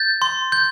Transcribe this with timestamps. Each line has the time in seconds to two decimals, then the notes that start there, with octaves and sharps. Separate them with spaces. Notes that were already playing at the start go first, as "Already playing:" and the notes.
Already playing: G6 A6
0.22 C6
0.52 G6